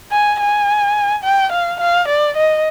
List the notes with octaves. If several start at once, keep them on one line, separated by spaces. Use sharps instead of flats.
G#5
G#5
G5
F5
F5
D5
D#5